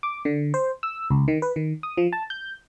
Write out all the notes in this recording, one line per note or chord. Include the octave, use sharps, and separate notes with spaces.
D6
D3
C5
E6
C#2
D#3
B4
D#3
D#6
F3
A5
G6